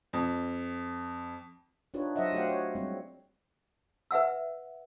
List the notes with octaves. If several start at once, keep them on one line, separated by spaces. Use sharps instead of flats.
F2
D4 D#4 F4 G4 B4 C#5
F#3 C5 D#5 E5 F#5
F#3 A3 G4 C5 F5 F#5
C#5
G3 G#3 C4
B4 E5 F#5 E6